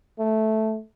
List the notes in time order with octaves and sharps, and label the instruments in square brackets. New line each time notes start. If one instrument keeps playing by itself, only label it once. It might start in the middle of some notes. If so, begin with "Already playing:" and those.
[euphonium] A3